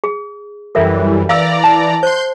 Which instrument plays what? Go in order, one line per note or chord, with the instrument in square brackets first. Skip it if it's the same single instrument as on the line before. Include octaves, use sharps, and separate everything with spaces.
[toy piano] G#4
[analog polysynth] F#2 E3 G3 [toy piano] A4 A#4 E5
[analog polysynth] E3 D5 A#5 [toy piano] F5 E6
[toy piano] A5
[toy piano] C5 [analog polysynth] C6 G6